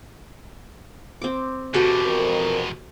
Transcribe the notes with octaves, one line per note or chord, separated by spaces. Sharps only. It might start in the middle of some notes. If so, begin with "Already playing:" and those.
C4 D6
E2 B2 F#4 G4 A4
F2 A#4